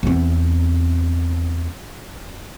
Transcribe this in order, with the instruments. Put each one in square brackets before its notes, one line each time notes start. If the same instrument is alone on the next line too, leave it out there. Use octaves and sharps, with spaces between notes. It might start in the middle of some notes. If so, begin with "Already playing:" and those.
[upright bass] E2 C4